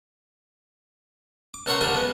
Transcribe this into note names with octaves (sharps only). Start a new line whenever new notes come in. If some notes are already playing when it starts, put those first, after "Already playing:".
D6
C#2 A4 A#4 C#5 F#5 C6
D3 F3 G3 D4 A4 A#4
G#3 B3